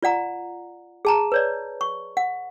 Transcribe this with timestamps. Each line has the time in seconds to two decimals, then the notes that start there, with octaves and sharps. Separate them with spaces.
0.02 F4 D5 F#5 A#5
1.05 G#4 A5 A#5
1.32 B4 C#5 D5
1.81 C#6
2.17 F#5